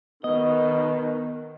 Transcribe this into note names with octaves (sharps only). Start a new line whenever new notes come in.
B2 D#3 B3 D#5